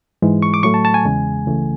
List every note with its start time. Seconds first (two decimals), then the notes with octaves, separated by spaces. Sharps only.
0.22 G#2 E3 G#3
0.43 C#6
0.54 D6
0.63 A2 F#3 A3 C#6
0.74 A5
0.85 A5
0.94 G#5
1.05 E2 C#3 G#3
1.46 C#2 C#3 E3 A3